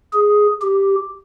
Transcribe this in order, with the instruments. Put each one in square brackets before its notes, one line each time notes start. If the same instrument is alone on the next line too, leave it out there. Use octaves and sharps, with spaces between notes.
[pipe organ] G#4
G4